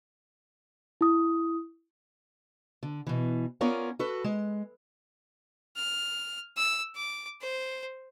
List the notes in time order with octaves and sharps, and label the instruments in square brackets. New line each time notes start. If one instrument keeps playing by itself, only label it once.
[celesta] E4 D#6
[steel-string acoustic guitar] D3
B2 E3
B3 C#4 F4 A#4 C#5 D5
F#4 A4 B4
G#3
[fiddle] F6
E6
D6
C5